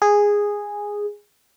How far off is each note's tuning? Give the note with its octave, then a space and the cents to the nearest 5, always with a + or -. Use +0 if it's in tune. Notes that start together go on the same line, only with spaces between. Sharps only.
G#4 -10